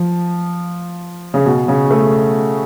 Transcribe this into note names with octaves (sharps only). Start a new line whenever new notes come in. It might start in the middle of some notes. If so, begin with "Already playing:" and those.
Already playing: F3
C#3
B2
C#3
A3